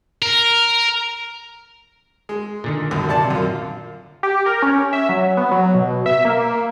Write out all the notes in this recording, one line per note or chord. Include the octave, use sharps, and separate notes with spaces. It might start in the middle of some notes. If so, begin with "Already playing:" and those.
A#4
G#3
A#2 D3 D#3
B1 F#2
C3 D5 A5
F#2 F4
G4
A#4
C#4
E5
F#3
B3
F#3
B2
E5
A#3